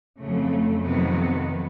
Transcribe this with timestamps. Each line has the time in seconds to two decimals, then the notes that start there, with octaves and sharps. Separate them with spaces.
0.19 F2 C#3 F#3 A3
0.84 F2 C3 D#3 F#3 B3